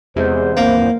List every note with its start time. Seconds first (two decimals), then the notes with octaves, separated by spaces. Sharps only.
0.16 E2 C3 G#3 C5
0.57 D1 A#1 A#3 C4